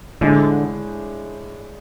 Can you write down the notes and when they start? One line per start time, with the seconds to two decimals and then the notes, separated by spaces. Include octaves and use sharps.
0.21 A2 D3 G#3 D4 G#4